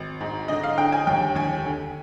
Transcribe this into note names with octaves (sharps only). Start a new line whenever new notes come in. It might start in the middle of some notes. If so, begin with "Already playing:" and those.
Already playing: G#1
G#2
D3 D#5
F5
D3 G5
G#5
D#2 G5
D#2 G#5
D3